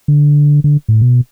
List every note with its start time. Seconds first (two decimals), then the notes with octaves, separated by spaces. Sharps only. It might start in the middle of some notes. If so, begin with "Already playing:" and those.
0.08 D3
0.64 D3
0.88 A2
1.01 B2